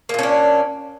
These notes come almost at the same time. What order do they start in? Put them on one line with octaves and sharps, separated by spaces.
A#3 A#2 C#4 D4